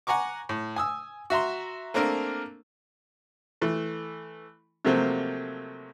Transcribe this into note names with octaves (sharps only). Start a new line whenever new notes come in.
F#5 G#5 A#5 C#6 D6
A2
G#5 D#6 E6
F#4 E5 A#5 C6
A3 A#3 C4 D4 A#4
E3 A3
C3 F3 F#3 A3 A#3 C4